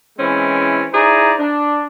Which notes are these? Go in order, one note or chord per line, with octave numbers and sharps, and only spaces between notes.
E3 G#3 C4 C#4 E4
D#4 E4 G#4 C5 D5 A#5
D4